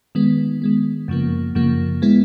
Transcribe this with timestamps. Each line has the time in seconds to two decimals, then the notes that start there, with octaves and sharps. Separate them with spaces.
0.15 D#3 G#3 B3
0.62 D#3 G#3 B3
1.08 F#2 C#3 F3 A#3
1.55 F#2 C#3 F3 A#3
2.02 G#3 B3 E4